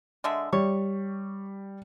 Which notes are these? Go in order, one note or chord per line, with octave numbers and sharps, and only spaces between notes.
D3 G#3 E5
G3 C#5